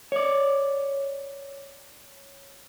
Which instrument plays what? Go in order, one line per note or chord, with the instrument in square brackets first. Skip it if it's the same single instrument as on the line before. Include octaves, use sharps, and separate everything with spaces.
[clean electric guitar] C#5 D5